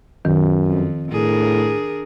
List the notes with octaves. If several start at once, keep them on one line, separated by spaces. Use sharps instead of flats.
F#2 D#3
F2
A2 D4 G#4 A#4